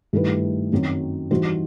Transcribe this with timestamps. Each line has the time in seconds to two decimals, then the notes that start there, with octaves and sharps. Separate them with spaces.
0.13 G2 D#3 A3 E4 B4
0.72 F#2 D#3 F#3 C4 F#4
1.31 E3 G3 D#4 F#4 C5